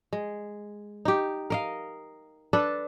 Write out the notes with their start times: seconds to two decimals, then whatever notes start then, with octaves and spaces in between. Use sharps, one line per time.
0.13 G#3
1.05 D#4 G4
1.50 A#4 D#5 F5
2.53 D4 A4 B4